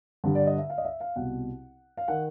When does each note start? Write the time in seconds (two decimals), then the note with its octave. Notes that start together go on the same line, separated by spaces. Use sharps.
0.24 G2 D3
0.35 D5
0.47 D#5
0.59 E5
0.70 F5
0.78 D#5
0.85 E5
1.00 F5
1.16 C2 B2 F#5
1.97 F5
2.08 D#3 F#5